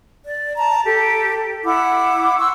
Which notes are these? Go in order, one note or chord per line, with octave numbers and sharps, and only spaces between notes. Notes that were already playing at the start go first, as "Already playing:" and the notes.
D5
A5 A#5
G4 A4
E4 F#5 D6
F#5 C6 C#6 E6